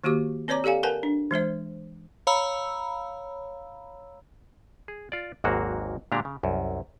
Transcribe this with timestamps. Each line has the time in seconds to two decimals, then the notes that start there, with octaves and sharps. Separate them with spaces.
0.04 D#3 A#3 F#4 G4 D6
0.48 C4 B4 C#5 D5 A#5 D6
0.64 G4 A4 D5 F5 G#5
0.83 A#4 B4 F#5 G#5 A5
1.03 D4
1.31 E3 G#3 C5 E5
2.27 C#5 F5 A#5 B5 E6
4.88 G#4
5.12 F4 D5
5.44 G#1 D#2 G#2 F#3 A#3 F#4
6.12 A#2 D3 G#3 D4 G4 A#5
6.25 C#3
6.43 C2 F#2